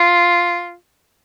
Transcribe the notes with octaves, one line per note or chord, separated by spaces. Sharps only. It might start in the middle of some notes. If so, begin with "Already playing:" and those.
Already playing: F4